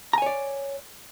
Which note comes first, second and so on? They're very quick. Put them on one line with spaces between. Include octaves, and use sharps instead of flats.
A#5 G#5 C#5 D5